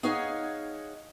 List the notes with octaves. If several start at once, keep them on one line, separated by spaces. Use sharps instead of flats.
D#4 G#4 C#5 F5 F#5 G#5